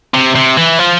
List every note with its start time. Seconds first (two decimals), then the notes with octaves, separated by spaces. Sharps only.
0.14 C3
0.35 C3
0.57 E3
0.79 F3